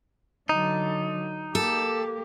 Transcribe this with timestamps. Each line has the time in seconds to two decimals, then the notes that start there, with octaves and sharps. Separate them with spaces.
0.49 D3 F#3 D#4
1.55 A#3 G4 A4